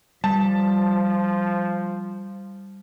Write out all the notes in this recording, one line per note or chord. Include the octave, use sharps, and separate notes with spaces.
F3 G3 A5